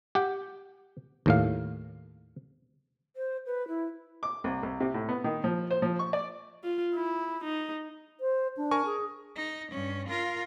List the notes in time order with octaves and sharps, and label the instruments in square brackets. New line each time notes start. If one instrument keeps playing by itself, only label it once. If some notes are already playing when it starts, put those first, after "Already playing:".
[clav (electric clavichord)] G4 F#5 G5
D#2 A2 F5
[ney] C5
B4
E4
[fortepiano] D6
C2
C2
C3
A2
B3
D#3
F3
C5
F3
C#6
D5
[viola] F4
E4
D#4
[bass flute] C5
D4
[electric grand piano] A#4 G#5 C#6
[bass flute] G#4
[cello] D#4
G2 C#4
F4 A#4